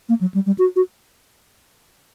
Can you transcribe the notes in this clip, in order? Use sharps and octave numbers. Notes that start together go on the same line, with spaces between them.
A#3
F#3
G3
G3
F#4
F#4